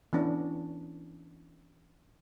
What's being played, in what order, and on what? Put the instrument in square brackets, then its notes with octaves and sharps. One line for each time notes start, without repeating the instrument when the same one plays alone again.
[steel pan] E3 B3 C#4 D4